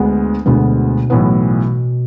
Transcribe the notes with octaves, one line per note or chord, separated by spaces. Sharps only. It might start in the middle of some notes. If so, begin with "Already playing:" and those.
Already playing: D2 D3 G#3 B3
D2 B2 D3 G#3 B3
B1 A2 E3 B3